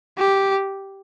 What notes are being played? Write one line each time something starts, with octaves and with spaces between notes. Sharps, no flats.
G4